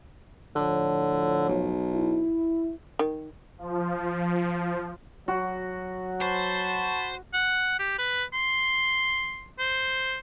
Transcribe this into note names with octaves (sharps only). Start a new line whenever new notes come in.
A2 D3 F3 C#5
B1
E4
D#3
F3
F#3 F#4
C5 A5 B5 C#6
F#5
G4
B4
C6
C5